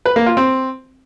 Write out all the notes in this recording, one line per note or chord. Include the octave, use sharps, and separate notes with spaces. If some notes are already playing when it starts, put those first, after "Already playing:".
B4
A#3
F4
C4